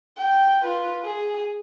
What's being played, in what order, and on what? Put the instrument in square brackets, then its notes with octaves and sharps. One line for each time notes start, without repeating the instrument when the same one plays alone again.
[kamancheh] G5
F4 B4
G#4